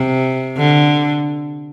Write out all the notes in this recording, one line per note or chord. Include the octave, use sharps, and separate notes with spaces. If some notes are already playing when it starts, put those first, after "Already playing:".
Already playing: C3
D3